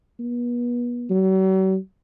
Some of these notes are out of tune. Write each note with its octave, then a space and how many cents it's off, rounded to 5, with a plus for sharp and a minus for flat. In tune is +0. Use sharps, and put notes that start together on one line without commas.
B3 -35
F#3 +45